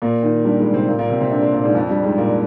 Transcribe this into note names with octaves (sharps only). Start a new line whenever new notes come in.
A#2 A#3
D#3
G2 G3
G#2 G#3
C3 C4
A#2 A#3
A#2 A#3
C3 C4
C3 C4
D3 D4
C3 C4
A#2 A#3
G#2 G#3
F2 F3
G2 G3
G#2 G#3
A#2 A#3